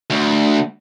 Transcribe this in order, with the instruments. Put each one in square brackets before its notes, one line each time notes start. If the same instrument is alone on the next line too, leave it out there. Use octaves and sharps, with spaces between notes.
[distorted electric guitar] D2